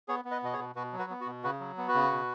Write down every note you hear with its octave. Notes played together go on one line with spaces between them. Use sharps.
B3 G#4 C#5
B3
B4 D#5
B2 D#5
G#4 C#5
B2
B2 F#4 B4
F#3
F#4 B4
B3
F#4
B2
C#3 F#4 B4
F#3
B3
F#4 B4
C#3
B2